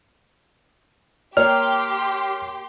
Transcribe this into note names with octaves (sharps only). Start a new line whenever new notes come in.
A#3 G4 C#5 C6 F6